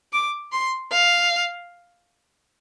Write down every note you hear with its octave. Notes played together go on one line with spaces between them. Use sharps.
D6
C6
F5